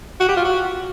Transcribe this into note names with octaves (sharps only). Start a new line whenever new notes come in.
F#4
G4
F4
F#4